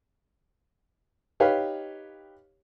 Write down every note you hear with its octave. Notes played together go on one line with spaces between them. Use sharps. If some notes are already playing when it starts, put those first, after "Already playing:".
D#4 G4 B4 C#5 F5